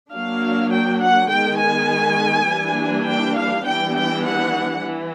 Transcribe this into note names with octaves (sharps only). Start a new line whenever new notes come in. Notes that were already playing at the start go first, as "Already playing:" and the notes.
F#3 A#3 D4 F5
G5
F#5
D#3 G#3 B3 G5
G#5
E3 G3 A#3 D4
G5
F5
E3 G3 B3 D4 G5
G5
F#5
E3